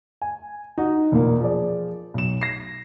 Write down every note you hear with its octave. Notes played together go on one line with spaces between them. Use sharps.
G#5
D#4 F#4
E1 A#2 A#3
F3 G#4 D5
B1 E7
A#6 C7